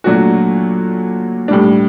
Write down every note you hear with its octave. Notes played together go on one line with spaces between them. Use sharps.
A#2 F#3 A3 D4 F#4
A2 G3 D4